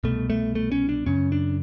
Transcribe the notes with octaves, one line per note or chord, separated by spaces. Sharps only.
C2 B2 A3
A3
A3
C#4
D4
F#2 C#3 C#4
D4